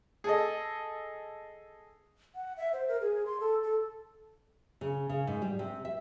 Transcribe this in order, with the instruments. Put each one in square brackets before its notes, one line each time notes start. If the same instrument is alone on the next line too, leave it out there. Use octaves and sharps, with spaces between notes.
[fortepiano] G#4 A4 D#5
[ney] F#5
E5
C5
A#4
G#4
C6
A4
A4
[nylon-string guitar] C#3
C#3
G#2
G3
C3
E5